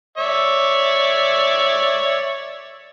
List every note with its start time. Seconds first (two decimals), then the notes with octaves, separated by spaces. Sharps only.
0.18 C#5 D5 E5